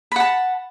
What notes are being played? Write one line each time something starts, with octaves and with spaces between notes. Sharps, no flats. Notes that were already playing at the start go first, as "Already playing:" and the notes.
F#5 A5 B5